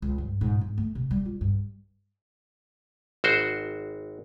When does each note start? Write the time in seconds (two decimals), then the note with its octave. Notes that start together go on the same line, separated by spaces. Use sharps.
0.02 C#2
0.18 G2
0.41 G#2
0.61 G#2
0.78 A3
0.95 C3
1.11 G3
1.25 F4
1.41 G2
3.24 G#1 F#4 C5